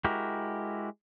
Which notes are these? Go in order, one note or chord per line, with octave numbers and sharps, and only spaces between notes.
G#3 E4 F#4 G4 A#4